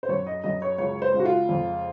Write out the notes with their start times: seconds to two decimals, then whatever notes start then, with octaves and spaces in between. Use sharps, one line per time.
0.03 C5
0.09 F#2 C#5
0.27 D#5
0.44 F#2 D#5
0.62 C#5
0.78 C#2 C#5
1.02 C5
1.14 C#2
1.20 F#4
1.25 F4
1.49 F2